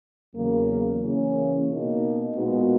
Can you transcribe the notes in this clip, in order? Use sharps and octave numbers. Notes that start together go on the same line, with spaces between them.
E2 C#3 F#3 A#3
C#3 E3 A#3 C#4
B2 A#3 D#4
A#2 G#3 B3 D#4 F#4